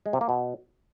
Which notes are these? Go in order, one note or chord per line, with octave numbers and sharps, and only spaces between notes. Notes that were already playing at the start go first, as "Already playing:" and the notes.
G#3
C3
A#3
B2